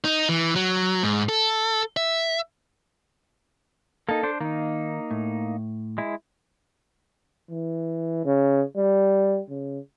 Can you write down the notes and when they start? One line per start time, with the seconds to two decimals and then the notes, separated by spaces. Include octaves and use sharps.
0.05 D#4
0.29 E3
0.56 F#3
1.03 G#2
1.29 A4
1.97 E5
4.09 A#3 D#4 A4
4.23 D4 C5
4.41 D#3 A#3 D#4
5.11 A2
5.98 G#3 E4
7.51 E3
8.25 C#3
8.77 G3
9.49 C#3